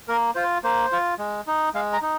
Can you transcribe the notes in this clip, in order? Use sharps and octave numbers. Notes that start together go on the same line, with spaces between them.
A#3 A#4
F4 C5
A#3 C5
F4
G#3
D#4
G#3 F5
A#5
D#4